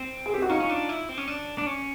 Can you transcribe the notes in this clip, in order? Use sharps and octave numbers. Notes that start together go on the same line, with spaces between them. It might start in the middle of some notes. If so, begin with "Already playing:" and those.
Already playing: C4
G#4
G4
F#4
C#4 D#4 F4
C#4
D4
E4
C4
C#4
D4
D4
C#4